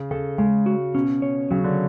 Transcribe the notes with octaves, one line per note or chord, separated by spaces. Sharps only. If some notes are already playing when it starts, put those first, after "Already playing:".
Already playing: C#3
C#3 A4
C#3 G#3
F#4
B2 C#4
C#5
C#3 F#3
D3